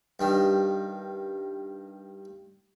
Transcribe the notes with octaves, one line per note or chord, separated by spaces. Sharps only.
G2 D#3